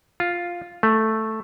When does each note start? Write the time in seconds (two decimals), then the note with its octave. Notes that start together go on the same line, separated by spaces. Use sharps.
0.20 F4
0.83 A3